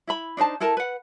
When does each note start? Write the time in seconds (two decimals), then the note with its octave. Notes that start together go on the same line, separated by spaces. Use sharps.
0.07 E4 E5 B5
0.37 D4 D#4 C5 A5
0.60 E4 A4 A#4 A5
0.77 B4 F#5